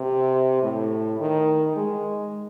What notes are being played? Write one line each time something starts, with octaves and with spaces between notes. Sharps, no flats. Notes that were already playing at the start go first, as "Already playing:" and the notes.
Already playing: C3
A2
D#3
G#3